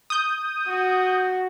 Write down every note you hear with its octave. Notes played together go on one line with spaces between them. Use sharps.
D#6 G6
F#4